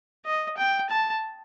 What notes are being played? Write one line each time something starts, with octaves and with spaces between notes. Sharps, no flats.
D#5
G5
A5